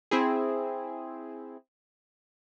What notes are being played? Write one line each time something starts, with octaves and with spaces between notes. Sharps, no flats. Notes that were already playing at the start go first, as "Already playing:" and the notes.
C4 E4 G#4